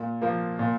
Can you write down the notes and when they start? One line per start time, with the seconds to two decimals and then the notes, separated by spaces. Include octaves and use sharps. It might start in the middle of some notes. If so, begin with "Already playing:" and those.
Already playing: A#2
0.22 F3 A#3
0.59 A#2